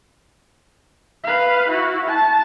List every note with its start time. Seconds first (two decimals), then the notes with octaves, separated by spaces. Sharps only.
1.24 B4 F5
1.69 E4 F#4
2.07 A5